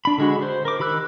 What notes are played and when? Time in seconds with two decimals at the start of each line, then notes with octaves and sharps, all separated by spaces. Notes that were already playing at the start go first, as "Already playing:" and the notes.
0.05 D4 B5
0.18 D3 G#3 F#4
0.42 C5
0.65 A#4 D6
0.80 D#3 G4 B5 E6 F#6